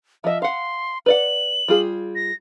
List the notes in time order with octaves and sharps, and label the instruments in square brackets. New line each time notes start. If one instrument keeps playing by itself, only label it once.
[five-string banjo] F3 D#5 [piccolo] E5
[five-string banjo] F5 F#5 [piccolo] C6
[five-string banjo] B4 D5 F#5 [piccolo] F#7
[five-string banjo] G3 F4 G#4
[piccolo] A#6